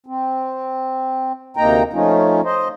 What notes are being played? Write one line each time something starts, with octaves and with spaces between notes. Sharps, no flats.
C4
D2 C3 A#3 D#4 G5 A#5
F3 A3 C#4 D#4 F4
C5 D#5